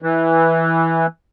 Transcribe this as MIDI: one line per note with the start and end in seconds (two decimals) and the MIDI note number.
0.02 1.06 52